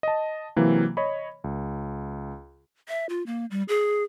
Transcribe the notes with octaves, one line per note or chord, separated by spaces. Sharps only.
D#5 A5
C3 E3 F#3 A#3
C#5 D#5 B5
C#2
E5
F4
A#3
G3
G#4